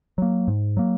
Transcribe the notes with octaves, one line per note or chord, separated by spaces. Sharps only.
F#3 A#3
G#2
F#3 A#3